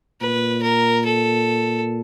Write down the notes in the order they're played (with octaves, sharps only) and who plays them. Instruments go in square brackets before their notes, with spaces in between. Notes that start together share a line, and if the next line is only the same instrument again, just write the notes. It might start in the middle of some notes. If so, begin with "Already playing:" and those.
[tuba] A#2 [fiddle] B4
[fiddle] A#4
A4